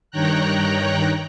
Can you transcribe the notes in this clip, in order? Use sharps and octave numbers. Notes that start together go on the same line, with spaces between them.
G2 D#3 C#5 G5 A#5 F#6